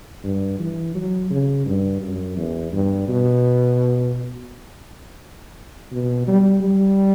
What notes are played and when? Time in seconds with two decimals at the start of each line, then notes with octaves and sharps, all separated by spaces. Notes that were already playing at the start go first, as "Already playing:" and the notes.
0.24 G2
0.59 E3
0.95 F#3
1.30 C#3
1.66 G2
2.02 F#2
2.37 E2
2.73 G2
3.08 B2
5.92 B2
6.28 G3
6.63 G3